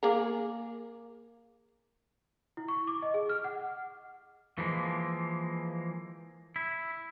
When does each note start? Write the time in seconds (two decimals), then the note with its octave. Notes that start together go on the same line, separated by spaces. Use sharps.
0.03 A#3 G#4 A#4
2.57 E4
2.68 C#6
2.87 D6
3.02 D#5
3.14 G#4
3.29 F6
3.44 F#5
4.58 E3 F3 G#3 A#3
6.56 E4